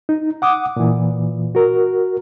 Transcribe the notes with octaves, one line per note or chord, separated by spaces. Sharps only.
D#4
F#5 D6 D#6
A#2 E3
F#4 A#4